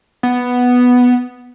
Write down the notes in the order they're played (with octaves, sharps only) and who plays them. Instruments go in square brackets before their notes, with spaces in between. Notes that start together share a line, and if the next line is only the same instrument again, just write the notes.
[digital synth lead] B3